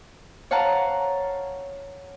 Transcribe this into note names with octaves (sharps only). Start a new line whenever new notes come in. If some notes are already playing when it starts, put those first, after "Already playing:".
C#5 F5 F#5 A5 A#5